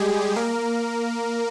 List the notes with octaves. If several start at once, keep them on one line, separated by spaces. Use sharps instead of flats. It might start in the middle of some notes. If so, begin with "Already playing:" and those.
Already playing: G3 G#3 G4 G#4
A#3 A#4